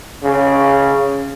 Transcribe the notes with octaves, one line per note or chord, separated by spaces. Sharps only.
C#3